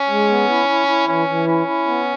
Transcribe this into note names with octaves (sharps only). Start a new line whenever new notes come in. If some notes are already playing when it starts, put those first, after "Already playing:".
Already playing: C#4
G#3
B3
E4
E4
E4
E3 C#4
E3
C#4 E4
E4
B3